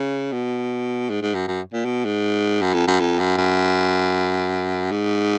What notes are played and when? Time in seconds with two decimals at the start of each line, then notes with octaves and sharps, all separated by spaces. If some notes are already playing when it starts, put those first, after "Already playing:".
Already playing: C#3
0.32 B2
1.10 G#2
1.22 G#2
1.35 F#2
1.48 F#2
1.73 A#2
1.85 B2
2.05 G#2
2.62 F#2
2.74 F2
2.88 F#2
3.00 F2
3.19 F#2
3.38 F#2
4.91 G#2